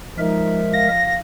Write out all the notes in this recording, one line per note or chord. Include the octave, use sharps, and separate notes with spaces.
F3 G#3 D#4 A#4 E5
F5 A#6